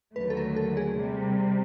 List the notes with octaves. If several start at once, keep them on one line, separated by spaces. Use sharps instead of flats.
D#2 D3 F#3 A3 B4
A4
A#4
A4
G#4
C3 G3